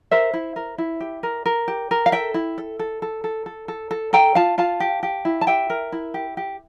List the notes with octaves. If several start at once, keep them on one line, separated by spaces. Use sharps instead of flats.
A#4 C5 E5
E4
A#4
E4
G4
A#4
A#4
G4
A#4
F5
A4 E5 G5
E4
A4
A4
A4
A4
A4
A4
A4
A4 G5 A#5
F4 F5 A5
F4 F5 A5
G4
G4
E4
A5
G4 E5 G5
A#4
E4
G4
G4